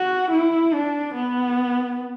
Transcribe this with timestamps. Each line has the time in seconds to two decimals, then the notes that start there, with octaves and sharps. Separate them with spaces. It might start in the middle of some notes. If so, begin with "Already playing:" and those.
Already playing: F#4
0.31 E4
0.73 D4
1.15 B3